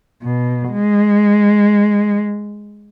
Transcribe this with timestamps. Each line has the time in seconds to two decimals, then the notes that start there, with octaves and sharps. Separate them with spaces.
0.22 B2
0.72 G#3